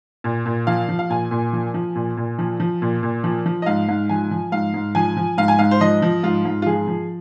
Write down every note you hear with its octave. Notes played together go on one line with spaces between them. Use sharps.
A#2
A#2
F3 F5
F3
F5
A#2 G#5
A#2
F3
F3
A#2
A#2
F3
F3
A#2
A#2
F3
F3
D#5
G#2 F5
G#2
F3 G#5
F3
G#2 F5
G#2
F3 G#5
F3
G#2 F5
G#5
G#2 F5
C5
F3 D#5
F3
G#2 F4
G#2
F4
F3 G#4
F3